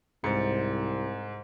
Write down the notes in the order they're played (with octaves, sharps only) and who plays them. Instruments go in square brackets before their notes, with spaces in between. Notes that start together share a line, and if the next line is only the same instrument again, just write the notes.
[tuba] C2 [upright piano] G#2 [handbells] C5 A6 C#7